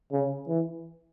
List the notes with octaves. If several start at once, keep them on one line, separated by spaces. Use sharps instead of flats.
C#3
E3